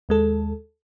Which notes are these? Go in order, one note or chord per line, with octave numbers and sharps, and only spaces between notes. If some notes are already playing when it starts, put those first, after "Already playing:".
D#2 G#3 A4